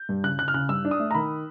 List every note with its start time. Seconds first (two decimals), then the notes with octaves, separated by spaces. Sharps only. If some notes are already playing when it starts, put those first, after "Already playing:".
Already playing: G6
0.09 G2
0.24 C#3 F#6
0.39 C#3 F#6
0.48 F6
0.54 C#3 F#6
0.69 G2 E6
0.85 D4
0.91 D#6
1.00 A3
1.11 A#5
1.14 D#3 B5